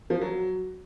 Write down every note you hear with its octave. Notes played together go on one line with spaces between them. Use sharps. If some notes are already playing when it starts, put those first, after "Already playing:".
F3
F#3